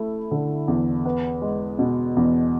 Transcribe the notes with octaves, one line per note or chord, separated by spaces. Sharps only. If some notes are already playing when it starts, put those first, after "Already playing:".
Already playing: A3 E4
D3
E2
B3
G#3
B2
E2